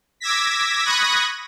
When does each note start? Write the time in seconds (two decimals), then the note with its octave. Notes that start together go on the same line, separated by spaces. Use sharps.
0.20 D6 E6 G#6 A#6 B6
0.85 B5 C#6 D#6 F#6 G#6 A#6